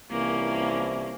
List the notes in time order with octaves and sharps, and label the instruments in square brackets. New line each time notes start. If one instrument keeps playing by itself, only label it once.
[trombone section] C2 E3 F3 [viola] A#3 C#4